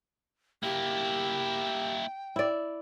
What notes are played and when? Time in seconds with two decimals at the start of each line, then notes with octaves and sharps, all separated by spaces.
0.63 A#3 E4 G4 G5
2.36 E4 D5